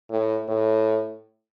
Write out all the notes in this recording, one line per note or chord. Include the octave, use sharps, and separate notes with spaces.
A2
A2